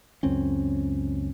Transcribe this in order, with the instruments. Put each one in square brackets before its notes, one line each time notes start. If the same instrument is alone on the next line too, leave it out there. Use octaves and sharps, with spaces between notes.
[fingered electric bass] C#2 F#2 C4 C#4